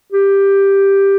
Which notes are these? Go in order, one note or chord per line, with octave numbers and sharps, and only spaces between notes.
G4